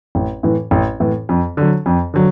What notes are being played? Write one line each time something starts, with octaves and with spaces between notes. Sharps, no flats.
A1
A2 E3
A1
A2 E3
F2
D3 F#3
F2
D3 F#3